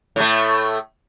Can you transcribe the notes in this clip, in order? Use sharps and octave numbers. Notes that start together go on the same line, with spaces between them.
A2 A3